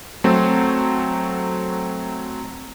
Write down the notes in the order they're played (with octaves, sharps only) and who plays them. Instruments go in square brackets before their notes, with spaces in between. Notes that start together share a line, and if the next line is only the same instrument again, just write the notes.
[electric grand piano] F#3 A3 C4